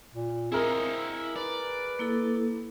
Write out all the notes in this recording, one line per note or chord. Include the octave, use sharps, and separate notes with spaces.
A#2
C4 E4 G#4 A#4 D#5
B4 D5
A#3 E4 A4